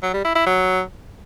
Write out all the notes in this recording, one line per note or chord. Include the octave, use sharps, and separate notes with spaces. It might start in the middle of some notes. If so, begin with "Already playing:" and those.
F#3
G3
E4
E4
F#3